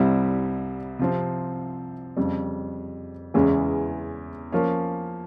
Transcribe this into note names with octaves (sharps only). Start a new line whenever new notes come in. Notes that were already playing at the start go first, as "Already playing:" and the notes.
Already playing: C2 C3 G3 C4 E4
C3 F3 C4
F2 C#3 G3
E2 C#3 E3 G#3 C#4
F3 A#3 C#4